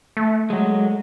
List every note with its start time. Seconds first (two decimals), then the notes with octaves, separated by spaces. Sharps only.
0.17 A3
0.50 F#3 G#3